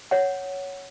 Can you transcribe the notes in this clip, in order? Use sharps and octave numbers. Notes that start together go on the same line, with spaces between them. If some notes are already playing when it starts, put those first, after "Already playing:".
C#5 F#5